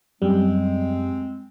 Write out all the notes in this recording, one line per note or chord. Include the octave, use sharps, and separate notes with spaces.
F#2 G3 G#3 C4